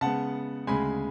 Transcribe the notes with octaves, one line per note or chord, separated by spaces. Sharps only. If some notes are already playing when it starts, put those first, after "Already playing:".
C#3 G#3 B3 F#5 A5
D2 C#3 G#3 G#5 B5